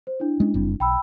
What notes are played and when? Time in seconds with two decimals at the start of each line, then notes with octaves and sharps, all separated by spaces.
0.07 C5
0.20 D4 E4
0.40 G#3 C#4
0.54 F#1 G3 C4
0.80 B1 G5 B5 E6